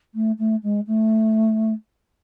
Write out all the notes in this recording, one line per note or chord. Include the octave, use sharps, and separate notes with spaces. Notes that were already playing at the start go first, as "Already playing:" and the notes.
A3
A3
G#3
A3